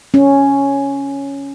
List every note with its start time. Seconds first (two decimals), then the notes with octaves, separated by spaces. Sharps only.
0.14 C#4